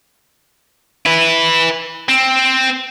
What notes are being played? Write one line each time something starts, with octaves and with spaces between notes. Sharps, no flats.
E4 B4
C4